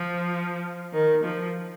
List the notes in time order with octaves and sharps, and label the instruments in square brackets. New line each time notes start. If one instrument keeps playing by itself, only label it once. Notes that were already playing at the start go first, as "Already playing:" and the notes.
Already playing: [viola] F3
D#3
F3